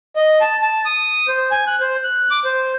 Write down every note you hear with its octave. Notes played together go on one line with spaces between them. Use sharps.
D#5
A5
A5
D#6
C5
G#5
F#6
C5
F#6
D6
C5